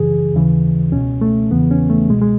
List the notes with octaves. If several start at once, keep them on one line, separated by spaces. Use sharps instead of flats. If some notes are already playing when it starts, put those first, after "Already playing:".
Already playing: F#2 C#3 E3 G#4
D#2 C#3 E3
C#2 B2 C#4
A3
E2 C#3 E3 B3
C#4
A3
C#2 B2 G#3
G#3